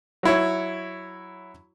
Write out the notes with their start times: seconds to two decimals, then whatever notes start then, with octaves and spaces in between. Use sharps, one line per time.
0.23 F#3 E4 C#5